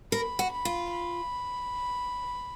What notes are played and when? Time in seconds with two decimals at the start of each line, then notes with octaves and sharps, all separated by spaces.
0.12 A#4 B5
0.39 F#4
0.52 B5
0.65 F4
0.92 B5